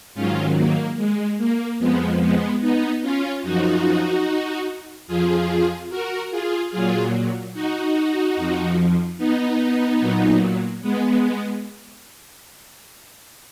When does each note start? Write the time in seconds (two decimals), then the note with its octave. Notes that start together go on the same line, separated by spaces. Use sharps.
0.15 G#2 D#3 F#3 C#4 F4
0.56 A#3
0.97 G#3
1.38 A#3
1.79 F2 F3 G#3 B3
2.20 G#3 B3
2.61 B3 D#4
3.02 C#4 F4
3.43 F#2 F3 D#4 F#4
5.07 F2 F3 F4 G#4
5.90 F#4 A#4
6.31 F4 G#4
6.72 A#2 F#3 F4 G#4
7.54 D#4 F#4
8.36 F2 F3
9.18 B3 D#4
10.00 A#2 F#3
10.82 G#3 B3